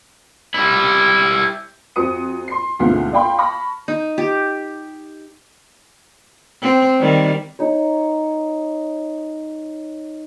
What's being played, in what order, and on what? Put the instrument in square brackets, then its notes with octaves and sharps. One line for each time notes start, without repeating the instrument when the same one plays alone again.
[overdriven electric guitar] G3 E4
[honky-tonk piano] F2 F#4 C5 D#6 C#7 D#7
C6 C7
D2 G#2 B2 C4 F4 C7
D5 F5 G5 B5 C6
A5 B5 C#6 F6 A#6
[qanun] D#4
G4
[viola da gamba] C4
D#3 G3
[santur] D#4 C#5